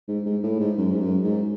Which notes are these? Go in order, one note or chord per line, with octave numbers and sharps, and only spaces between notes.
G#2
G#2
A2
G#2
F#2
G#2
F#2
G#2